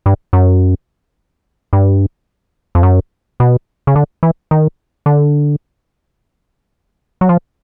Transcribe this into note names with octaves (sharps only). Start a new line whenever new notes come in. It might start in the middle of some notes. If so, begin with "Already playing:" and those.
G2
F#2
G2
F2
F#2
B2
C#3
D3
E3
D#3
D3
F#3
F3